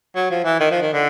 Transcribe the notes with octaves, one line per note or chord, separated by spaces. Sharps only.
F#3
F3
E3
D#3
F3
D#3
D3